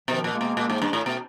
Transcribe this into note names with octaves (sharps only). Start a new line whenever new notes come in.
B2 D#3 F3
A#2
G#3 A#3
B2
A#2
G#2
G2
A2
B2 A3 B3